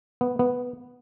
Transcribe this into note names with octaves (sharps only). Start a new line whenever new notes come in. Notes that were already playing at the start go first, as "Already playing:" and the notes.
B3
B3